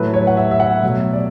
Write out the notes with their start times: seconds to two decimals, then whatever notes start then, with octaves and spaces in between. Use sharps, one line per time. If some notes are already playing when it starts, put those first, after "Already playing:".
Already playing: A2 F#3 A3 B4
0.14 C#5
0.27 F#5
0.37 E5
0.51 E5
0.60 F#5
0.83 B2 F#3 A3 E5
1.13 D5